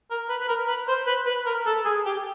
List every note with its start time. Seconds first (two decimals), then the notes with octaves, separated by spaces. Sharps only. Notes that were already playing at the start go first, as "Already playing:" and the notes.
0.10 A#4
0.29 B4
0.40 B4
0.48 A#4
0.68 B4
0.88 C5
1.07 B4
1.26 B4
1.46 A#4
1.66 A4
1.85 G#4
2.05 G4